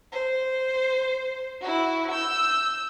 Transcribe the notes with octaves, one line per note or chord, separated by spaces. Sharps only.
C5
E4 F#4
E6 G6